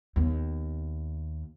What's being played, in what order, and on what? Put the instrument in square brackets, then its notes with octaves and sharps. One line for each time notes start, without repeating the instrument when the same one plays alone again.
[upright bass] D#2 B3